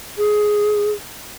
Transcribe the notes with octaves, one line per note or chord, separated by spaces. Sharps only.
G#4